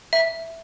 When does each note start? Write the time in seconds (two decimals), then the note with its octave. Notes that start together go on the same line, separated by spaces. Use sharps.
0.13 E5